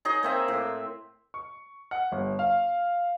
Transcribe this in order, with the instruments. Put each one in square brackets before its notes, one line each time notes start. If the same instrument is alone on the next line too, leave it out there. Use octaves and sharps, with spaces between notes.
[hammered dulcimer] D#4 G#4 C#5 D#5
A#3 C4 E5
A2
[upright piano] C#6
F#5
G1
F5